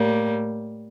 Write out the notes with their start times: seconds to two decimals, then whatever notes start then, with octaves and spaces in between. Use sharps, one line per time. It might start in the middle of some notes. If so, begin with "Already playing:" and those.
Already playing: A2 G3 A#3